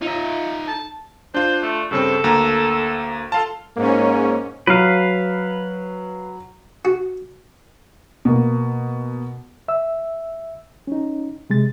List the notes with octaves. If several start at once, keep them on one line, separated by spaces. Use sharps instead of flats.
D#4 F4 E5
A5
D4 F4 C5
A3
G2 C#3 C4 A4
D2 A#3 A#5
F4 A4 F5 A5
G#2 A#3 C#4
F#3 B4 F5
F#4
B2 A#3
E5 E6
C#4 D#4
C3 G#3 A6